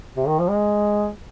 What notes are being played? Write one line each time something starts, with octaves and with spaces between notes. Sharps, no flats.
C3
D#3
F3
G#3